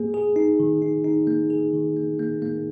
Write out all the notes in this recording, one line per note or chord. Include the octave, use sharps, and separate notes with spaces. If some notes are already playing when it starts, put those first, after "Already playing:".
Already playing: A#3 G#4
G#4
D#4
D#3
D#4
D#4
A#3
G#4
D#3
A#3
A#3
A#3